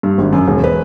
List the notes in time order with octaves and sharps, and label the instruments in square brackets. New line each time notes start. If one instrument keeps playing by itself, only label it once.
[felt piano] G2
G#1
F#2
E1
B4